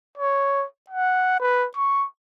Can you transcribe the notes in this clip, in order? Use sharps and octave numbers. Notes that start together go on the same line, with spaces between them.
C#5
F#5
B4
C#6